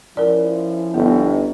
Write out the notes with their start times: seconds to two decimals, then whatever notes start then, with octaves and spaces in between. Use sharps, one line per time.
0.17 F3 C#4 E4 A#4 D5
0.94 G1 B3